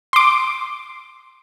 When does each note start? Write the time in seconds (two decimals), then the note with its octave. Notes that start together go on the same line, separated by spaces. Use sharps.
0.13 C6 D6